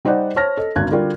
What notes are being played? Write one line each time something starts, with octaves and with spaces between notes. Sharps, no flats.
G3 D#4 C5 D5 D#5 F#5
C5 C#5 A5 F6 A#6
A4 D#5
G#1 D2 D4 F#6 G#6
D3 G3 F4 F#4 A#4 D5